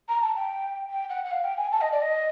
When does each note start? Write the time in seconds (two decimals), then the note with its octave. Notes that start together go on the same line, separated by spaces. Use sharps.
0.09 A#5
0.22 A5
0.36 G5
0.90 G5
1.10 F#5
1.25 F#5
1.31 F5
1.44 G5
1.57 G#5
1.72 A5
1.81 D#5
1.92 D5
2.02 D#5